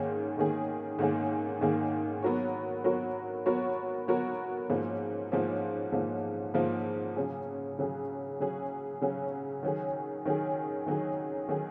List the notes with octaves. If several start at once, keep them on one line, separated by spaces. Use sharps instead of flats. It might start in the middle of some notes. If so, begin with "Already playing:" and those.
Already playing: G#2 D#3 A#3 C#4 G#4
G#2 D#3 A#3 C#4 G#4
G#2 D#3 A#3 C#4 G#4
G#2 D#3 A#3 C#4 G#4
F#3 B3 F#4 A#4 C#5
F#3 B3 F#4 A#4 C#5
F#3 B3 F#4 A#4 C#5
F#3 B3 F#4 A#4 C#5
G#2 F3 A#3 C#4
G#2 F3 A#3 C#4
G#2 F3 A#3 C#4
G#2 F3 A#3 C#4
C#3 F#3 C#4 G#4
C#3 F#3 C#4 G#4
C#3 F#3 C#4 G#4
C#3 F#3 C#4 G#4
D#3 F#3 C#4 G#4
D#3 F#3 C#4 G#4
D#3 F#3 C#4 G#4
D#3 F#3 C#4 G#4